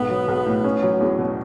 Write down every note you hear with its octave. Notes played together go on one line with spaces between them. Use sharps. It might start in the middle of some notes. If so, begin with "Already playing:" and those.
Already playing: B1 G#2 B3
F#3
B1
A2
C#4
F#3
E2
B2